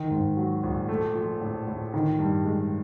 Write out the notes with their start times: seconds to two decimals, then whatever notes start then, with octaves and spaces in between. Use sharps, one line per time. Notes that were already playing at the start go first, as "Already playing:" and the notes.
Already playing: D#3
0.10 G#2
0.37 F#3
0.63 A#1
0.89 A3
1.15 F3
1.41 A2
1.67 A2
1.94 D#3
2.19 G2
2.45 G#3